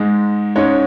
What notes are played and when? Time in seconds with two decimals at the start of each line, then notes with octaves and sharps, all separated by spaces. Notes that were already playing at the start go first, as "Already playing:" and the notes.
Already playing: G#2 G#3 D#4
0.56 G#2 G#3 C#4 D#4 C#5